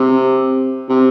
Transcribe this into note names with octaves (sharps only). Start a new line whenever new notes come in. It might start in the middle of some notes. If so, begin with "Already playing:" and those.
Already playing: C3
C3